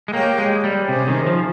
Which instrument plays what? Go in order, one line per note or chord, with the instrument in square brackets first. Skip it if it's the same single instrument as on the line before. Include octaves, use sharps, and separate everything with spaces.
[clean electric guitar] G#3
[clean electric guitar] A#3 [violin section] G4 C#5 G5
[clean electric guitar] G#3
G3
[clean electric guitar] C3 [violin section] C#4 G#4 C5
[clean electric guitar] D#3
F3